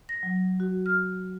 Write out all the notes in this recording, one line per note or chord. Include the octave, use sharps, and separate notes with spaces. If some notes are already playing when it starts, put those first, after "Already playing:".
A#6
F#3
F#4
F6